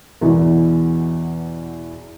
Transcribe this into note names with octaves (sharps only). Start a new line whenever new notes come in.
E2 B2 E3